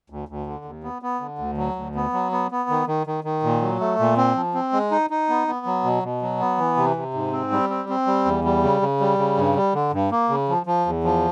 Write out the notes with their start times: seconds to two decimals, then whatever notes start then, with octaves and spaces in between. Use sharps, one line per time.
0.10 D2
0.29 D2
0.46 D3
0.65 D#2
0.83 B3
1.02 B3
1.20 D3
1.39 D2
1.57 F#3
1.76 D2
1.95 B3
2.13 F#3
2.32 B3
2.51 B3
2.70 D#3
2.87 D#3
3.07 D#3
3.24 D#3
3.43 A#2
3.61 F#3
3.80 A3
3.99 A#2
4.17 C4
4.36 F3
4.54 C4
4.73 G#3
4.91 D#4
5.10 D#4
5.29 B3
5.48 B3
5.66 F#3
5.84 B2
6.03 B2
6.22 F#3
6.39 B3
6.58 E3
6.77 C3
6.96 C3
7.14 G#2
7.32 C4
7.52 G3
7.69 C4
7.89 C4
8.07 G3
8.25 E2
8.44 G3
8.63 C#3
8.81 C#3
9.00 G3
9.18 C#3
9.37 G2
9.56 G3
9.74 D3
9.92 G2
10.11 A#3
10.29 C#3
10.49 F3
10.66 F3
10.86 E2
11.04 F3